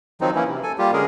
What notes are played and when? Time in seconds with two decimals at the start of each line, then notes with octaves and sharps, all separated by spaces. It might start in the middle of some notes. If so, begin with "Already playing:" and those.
0.21 D#3 F3 F#3 C4 D#4
0.35 E3 A#3 C#4 E4
0.48 C3
0.63 A4 G#5
0.78 G3 A#3 F4 G4
0.93 D3 G#3 C#4 G#4 A#4